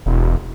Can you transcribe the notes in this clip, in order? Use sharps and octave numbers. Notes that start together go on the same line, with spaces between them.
E1